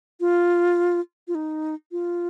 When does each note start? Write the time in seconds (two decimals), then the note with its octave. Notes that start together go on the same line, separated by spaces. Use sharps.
0.20 F4
1.28 F4
1.35 D#4
1.92 F4